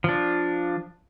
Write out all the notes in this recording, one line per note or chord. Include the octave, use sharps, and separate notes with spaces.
F3 D4